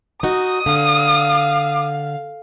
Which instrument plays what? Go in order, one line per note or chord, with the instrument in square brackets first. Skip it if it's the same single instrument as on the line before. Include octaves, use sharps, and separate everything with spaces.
[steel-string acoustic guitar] D#4 F#4 [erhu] D#6
[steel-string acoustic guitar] D3 [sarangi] F5